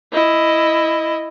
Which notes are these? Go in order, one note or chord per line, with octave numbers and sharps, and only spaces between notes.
E4 D#5